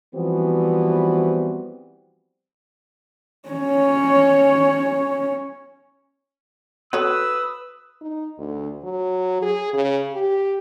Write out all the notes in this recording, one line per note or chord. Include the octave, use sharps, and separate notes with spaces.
E3 F3 G3 B3 C4 F#4
C#4 C#5
F#4 A4 B4 C#5 D#6 E6
D#4
D2
F#3
G#4
C#3
G4